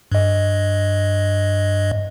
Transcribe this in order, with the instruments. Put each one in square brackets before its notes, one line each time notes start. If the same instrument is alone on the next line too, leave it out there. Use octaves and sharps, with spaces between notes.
[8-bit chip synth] G2 D#5